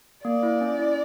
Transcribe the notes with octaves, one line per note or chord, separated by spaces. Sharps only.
A#3 D5
E4
C#4
E4